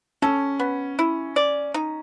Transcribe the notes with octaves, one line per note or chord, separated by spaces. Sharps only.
C#4 A4
B3
E4
D5
D#4